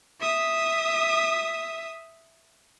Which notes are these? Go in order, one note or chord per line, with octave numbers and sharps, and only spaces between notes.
E5 D#6